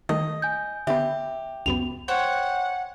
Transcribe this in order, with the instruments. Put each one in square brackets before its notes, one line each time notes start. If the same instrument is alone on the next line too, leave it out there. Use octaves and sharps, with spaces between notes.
[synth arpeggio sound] D#3 G3 A3 [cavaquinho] D#5
[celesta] G#5 G6
[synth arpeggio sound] D3 B3 [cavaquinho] G4 [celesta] E5
[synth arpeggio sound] C#2 F#2 B3 [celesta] F7
[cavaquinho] C5 C#5 G5 [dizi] F#5 [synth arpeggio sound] F#6